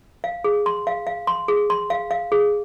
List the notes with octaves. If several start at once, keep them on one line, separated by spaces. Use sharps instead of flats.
F5
G#4
C6
F5
F5
C6
G#4
C6
F5
F5
G#4